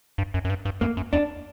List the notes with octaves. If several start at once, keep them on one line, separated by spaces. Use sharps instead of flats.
G2
F#2
F#2
G2
G2
F#2 A#3
F#2
E2 D4